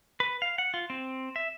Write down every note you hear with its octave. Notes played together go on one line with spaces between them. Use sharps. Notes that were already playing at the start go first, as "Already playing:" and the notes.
B4
F5
F#5
F4
C4
E5